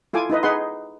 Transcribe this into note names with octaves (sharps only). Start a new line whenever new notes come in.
E4 F4 A4 G#5 D6
D#4 E4 B4 D#5
D#4 G#4 B4 F#5 C6